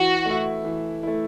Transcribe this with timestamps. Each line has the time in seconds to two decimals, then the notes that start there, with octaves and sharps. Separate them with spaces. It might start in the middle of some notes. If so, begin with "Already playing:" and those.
Already playing: E3 F#4
0.26 A3 E4
0.65 E3
1.03 A3 E4